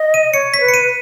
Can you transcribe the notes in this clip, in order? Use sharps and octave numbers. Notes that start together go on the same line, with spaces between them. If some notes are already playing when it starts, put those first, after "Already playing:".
Already playing: D#5
D#7
C#5 C#7
B6
B4
C#7
D#7